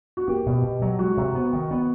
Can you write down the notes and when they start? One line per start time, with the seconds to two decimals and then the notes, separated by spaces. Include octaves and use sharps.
0.17 F#4
0.27 A#3 G4
0.46 B2
0.63 B2
0.82 F#3
0.99 G#3 F#4
1.17 C3
1.35 B3
1.53 D#3
1.71 B3